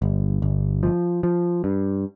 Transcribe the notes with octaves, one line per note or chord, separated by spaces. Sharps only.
G1
G1
F3
F3
G2